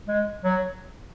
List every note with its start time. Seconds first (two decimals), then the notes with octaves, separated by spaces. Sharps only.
0.08 G#3
0.44 F#3